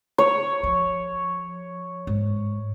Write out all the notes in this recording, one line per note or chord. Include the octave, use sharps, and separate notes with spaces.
C#5
F3
G#2